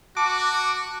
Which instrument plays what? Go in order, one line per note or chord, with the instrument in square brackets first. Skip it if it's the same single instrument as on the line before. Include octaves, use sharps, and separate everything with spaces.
[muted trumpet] F#4 [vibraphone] A5 [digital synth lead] D6